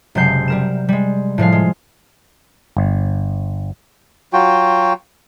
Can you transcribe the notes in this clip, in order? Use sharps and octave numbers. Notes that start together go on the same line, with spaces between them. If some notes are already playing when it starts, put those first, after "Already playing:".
F#1 C3 F#3 G#3 G6 C7
G3 A#4 E7
G3 G#3
A2 F3 G#3 F5
G#3
G1
F#3 F4 F#4 G5